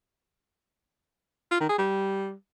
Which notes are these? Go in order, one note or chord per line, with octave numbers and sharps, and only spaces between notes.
F4
D#3
G#4
G3